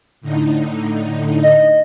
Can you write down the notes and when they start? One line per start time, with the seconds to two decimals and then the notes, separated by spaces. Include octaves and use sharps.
0.21 A2 D3 D#4
1.43 D#5